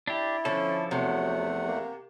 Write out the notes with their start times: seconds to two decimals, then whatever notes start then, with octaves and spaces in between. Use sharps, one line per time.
0.07 D4 E4 G4
0.45 D3 F3 C#4 A4
0.91 E2 C3 F#3 A3 F#5
1.67 A#3